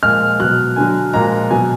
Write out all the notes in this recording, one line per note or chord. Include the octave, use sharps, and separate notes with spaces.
A#2 F3 G#3 F6
B2 F#3 F#6
D3 F#3 G#5
A#2 F3 G#3 A#5
B2 F#3 G#5